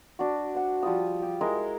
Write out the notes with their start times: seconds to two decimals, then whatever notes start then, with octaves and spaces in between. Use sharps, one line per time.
0.19 D4 F#4
0.54 C5 F#5
0.83 F3 G3 F4 D#6
1.22 G4
1.41 G#3 E4 A#4